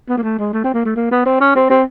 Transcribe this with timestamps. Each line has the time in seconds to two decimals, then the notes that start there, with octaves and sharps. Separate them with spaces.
0.09 B3
0.18 A#3
0.23 A3
0.38 G#3
0.53 A3
0.64 C4
0.74 A#3
0.85 A3
0.96 A#3
1.11 B3
1.26 C4
1.40 C#4
1.56 C4
1.70 C4